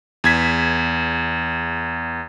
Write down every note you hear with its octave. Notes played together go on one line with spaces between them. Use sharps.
E2 G#6 B6